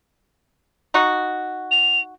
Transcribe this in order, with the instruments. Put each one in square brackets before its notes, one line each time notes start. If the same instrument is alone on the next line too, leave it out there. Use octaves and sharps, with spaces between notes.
[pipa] D#4 F#4
[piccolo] F7